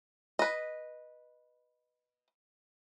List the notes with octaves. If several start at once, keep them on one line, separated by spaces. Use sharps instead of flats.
B4 D#5